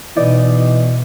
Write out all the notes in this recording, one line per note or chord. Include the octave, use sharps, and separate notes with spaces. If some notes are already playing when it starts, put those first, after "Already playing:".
B2 E3 D#4 D5 D#5